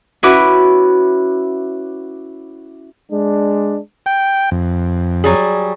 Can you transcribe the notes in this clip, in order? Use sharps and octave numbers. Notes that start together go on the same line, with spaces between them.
C#4 E4 F#4 B4 D6
G#3 D4
G5
F2
F#3 G3 G#4